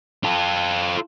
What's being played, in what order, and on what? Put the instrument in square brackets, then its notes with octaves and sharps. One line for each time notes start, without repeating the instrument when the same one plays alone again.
[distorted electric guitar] F4 A4